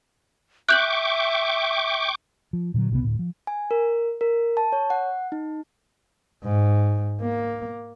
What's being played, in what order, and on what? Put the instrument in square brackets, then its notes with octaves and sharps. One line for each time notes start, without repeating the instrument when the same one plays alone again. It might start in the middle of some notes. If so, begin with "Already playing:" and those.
[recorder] E5 [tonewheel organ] G5 C#6 D6 [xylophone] F#6 G6 F#7
[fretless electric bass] F3
A#2 D3 F3 F#3
B1 C3 G3 B3
D2 A2
F3
[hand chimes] G#5
A#4
A#4
A5
C#5
F#5
D#4
[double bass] G#2
A#3